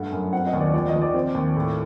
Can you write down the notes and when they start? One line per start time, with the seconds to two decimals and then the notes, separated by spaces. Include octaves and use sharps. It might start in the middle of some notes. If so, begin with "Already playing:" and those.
Already playing: G2 A3 F#5
0.12 F#2
0.33 C4 F#5
0.47 D#5
0.53 D#2
0.60 D5
0.74 A#1 D5
0.88 D#5
0.94 A#1
1.02 D5
1.14 C4
1.35 D#2
1.56 A2